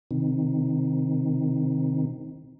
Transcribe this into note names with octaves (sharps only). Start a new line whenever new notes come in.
C3 D#3 C4 D#4